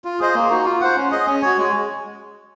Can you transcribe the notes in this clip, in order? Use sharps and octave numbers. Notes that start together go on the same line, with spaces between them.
F4
G#4 C5 D#5
A#3
D#4 F#4
F4
C5 F#5
C#4
G#4 D#5
C#4
F#4 C#5
G#3